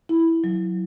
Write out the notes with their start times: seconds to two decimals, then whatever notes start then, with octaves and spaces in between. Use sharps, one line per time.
0.09 E4
0.44 F#3